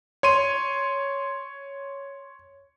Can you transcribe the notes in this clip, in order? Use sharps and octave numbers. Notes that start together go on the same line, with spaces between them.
C#5 C6 D#7